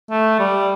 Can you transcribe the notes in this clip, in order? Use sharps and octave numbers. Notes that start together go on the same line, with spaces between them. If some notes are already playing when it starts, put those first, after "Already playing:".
A3
G3